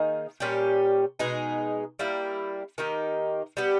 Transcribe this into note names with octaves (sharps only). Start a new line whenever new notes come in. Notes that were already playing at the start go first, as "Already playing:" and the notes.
Already playing: D#3 A#3 D#4 G#4
A#2 G3 C#4 G4
B2 G#3 D#4 G#4
G3 A#3 E4
D#3 A#3 D#4 G4
G3 B3 G4